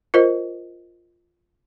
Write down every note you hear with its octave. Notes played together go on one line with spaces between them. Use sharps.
F4 A#4 C5 D#5